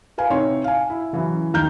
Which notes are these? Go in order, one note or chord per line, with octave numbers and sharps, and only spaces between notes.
A#4 B4 F5 G#5
C3 D#4 C#5 C6
F5 G#5
E4
C#3 E3 F#3 C#4
D#2 D#3 A#5 F6 G6